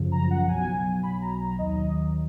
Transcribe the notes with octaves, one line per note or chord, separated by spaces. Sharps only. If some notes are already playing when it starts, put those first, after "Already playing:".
Already playing: G#1 F#2 C#3 F3
A#5
F#5
F#5
B1 B2 F#3 G#5
B5
A#5
A#5
D#2 D#3 F#3 D#5